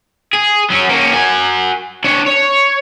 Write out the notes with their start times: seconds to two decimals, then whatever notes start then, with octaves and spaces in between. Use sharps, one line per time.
0.33 G#4
0.70 F#3 C#4
0.90 A#3 C#4
1.13 F#4 G#5
2.04 D4 C#5
2.26 C#5